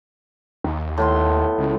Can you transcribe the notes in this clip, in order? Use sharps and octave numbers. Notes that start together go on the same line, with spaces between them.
D#2
A2 B3 C6
C#2